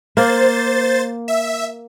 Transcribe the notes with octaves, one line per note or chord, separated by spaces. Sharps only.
A#3 C5 A6
E5